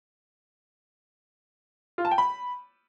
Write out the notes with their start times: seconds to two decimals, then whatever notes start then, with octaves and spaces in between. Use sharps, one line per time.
1.98 F4
2.05 A5
2.11 G5
2.18 B5